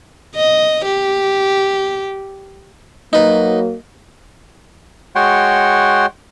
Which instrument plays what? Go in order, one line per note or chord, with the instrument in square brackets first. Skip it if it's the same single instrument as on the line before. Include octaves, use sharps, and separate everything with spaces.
[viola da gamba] D#5
G4
[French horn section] F#3 A#3 [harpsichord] D#4 B4
[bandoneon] G#3 F#4 C#5 F#5 G5 C6